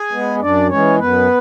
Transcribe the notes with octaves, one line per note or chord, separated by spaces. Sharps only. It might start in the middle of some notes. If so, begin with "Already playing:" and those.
Already playing: G#4 G#5
G#3 B3
F#2 D4 D5
E3 G#3 C#4 C#5
F#2 B3 B4